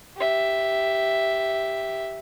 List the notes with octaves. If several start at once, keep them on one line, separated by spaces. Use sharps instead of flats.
G4 E5